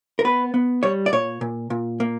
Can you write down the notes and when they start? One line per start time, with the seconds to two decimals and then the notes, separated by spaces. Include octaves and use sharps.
0.19 A#4
0.24 B3 B4
0.54 B3
0.83 G3 C#5
1.06 D5
1.12 A#2 C#5
1.41 A#2
1.70 A#2
2.00 A#3